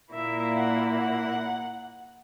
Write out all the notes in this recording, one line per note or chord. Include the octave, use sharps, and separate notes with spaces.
A#2 A#3 E4 E5
F#5
F#5